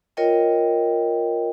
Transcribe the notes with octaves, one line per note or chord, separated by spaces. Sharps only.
F4 A#4 C#5 D#5 G5